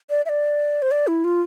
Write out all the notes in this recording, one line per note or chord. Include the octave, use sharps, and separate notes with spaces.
D5
E5
D5
C5
D5
E4
F4